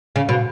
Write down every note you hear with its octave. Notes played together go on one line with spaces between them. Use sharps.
C#3
B2